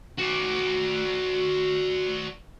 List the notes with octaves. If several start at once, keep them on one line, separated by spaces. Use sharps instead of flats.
F#4 D5